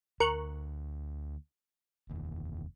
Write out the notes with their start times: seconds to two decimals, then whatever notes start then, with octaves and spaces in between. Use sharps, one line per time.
0.20 D2 A#4 C#6 F#6
2.09 F1 D#2